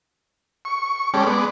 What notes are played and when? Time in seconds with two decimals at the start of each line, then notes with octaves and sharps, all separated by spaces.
0.65 C#6
1.14 G#3 C#4 G4 A4 D5
1.26 G#3 B3 D5